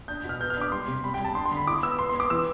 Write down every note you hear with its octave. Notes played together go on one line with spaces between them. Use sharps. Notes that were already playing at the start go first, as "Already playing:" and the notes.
D4 G6
B2
F6
B3 G6
F6
D4 D6
G3 C6
C3
G3 B5
G5
G3
A5
D4 C6
C6
D3
B5
E4 D6
B3 E6
B3 C6
C6
B3
D6
E3 E6